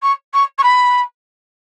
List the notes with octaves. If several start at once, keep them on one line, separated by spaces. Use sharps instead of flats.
C#6
C#6
C#6
B5